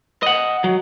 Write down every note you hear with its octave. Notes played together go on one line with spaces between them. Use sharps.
D#5 F#5
F#3